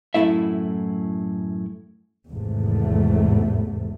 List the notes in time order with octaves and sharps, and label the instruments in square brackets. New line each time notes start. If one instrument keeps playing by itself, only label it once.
[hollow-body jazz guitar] F#2 A2 F3 A3 E4 E5
[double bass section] G#1 E2 G#2 C3 A3